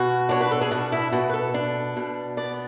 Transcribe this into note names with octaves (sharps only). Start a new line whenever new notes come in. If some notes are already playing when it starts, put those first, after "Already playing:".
Already playing: B2 F#4
D4 C#5
B4
A4
G#4
B2 F#4
E4
B2 F#4
B4
A4
D4
B2
B3 D5